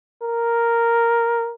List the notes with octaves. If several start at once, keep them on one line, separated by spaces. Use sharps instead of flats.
A#4